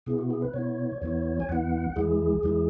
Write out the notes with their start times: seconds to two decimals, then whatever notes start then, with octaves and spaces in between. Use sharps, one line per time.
0.06 B2 B3 E4 G#4
0.19 F#4
0.30 G#4
0.42 B4
0.53 B2 B3 E4 C#5
1.02 E2 E3 B3 E4 C#5
1.40 G#5
1.49 E2 E3 B3 E4 F#5
1.96 E2 E3 G#3 E4 G#4
2.43 E2 E3 G#3 E4